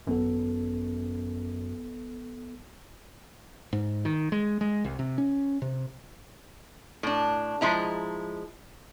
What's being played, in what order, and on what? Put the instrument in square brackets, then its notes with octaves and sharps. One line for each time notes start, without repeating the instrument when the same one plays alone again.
[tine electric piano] G#1 B3 A4 [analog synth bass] F#2
[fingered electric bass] G#2
D#3
G#3
G#3
C2
C3
C#4
C3
[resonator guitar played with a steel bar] A2 D4
F3 G#3 E4 A#5